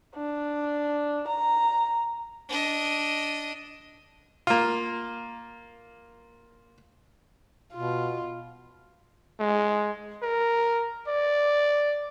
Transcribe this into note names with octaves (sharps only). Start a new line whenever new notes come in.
D4
A#5
D4 D#5
A#3 F4
B2 F4
G#3
A#4
D5